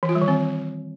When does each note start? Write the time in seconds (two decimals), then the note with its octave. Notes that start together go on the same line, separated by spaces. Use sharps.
0.03 E3
0.09 F4
0.15 G3
0.22 D#3
0.28 C4